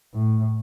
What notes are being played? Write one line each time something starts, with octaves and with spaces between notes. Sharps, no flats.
A2